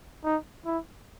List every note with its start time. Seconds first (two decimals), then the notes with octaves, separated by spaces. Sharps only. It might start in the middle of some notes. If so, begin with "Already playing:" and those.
0.24 D#4
0.66 E4